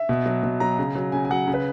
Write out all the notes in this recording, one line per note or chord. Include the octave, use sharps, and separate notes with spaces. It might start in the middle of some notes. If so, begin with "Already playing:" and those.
Already playing: E5
B2
F#3
B2
F#3 A#5
C#3
F#3
C#3 G#5
G#5
F#3 F#5
C#3
B4